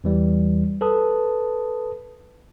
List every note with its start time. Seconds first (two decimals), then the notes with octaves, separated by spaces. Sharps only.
0.04 E2 E3 G3
0.81 A4 B4 A5 D#6